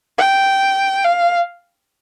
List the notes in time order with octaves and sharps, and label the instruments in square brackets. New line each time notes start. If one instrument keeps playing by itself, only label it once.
[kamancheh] G5
F5